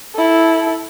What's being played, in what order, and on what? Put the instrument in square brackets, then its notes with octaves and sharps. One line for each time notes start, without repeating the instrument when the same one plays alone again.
[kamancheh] E4 A4